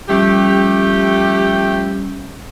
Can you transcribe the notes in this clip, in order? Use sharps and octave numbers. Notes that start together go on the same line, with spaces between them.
F3 G3 A3 C#4 G4